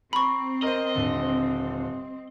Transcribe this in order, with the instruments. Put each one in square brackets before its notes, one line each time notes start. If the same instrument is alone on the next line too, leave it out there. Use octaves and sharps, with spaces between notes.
[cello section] C4 [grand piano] A#5 [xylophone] B5 C#6
[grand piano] A#4 C5 [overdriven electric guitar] D#5
[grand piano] D#1 D3